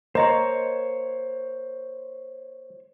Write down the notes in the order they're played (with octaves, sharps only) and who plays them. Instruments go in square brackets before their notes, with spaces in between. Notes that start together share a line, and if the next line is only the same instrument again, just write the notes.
[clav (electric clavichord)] A#3 A#5 [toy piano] A#4 D#5 C6 [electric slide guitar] C5 C#5